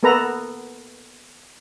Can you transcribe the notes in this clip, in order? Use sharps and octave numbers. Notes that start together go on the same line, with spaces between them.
A#3 B3 A4 B4 A#5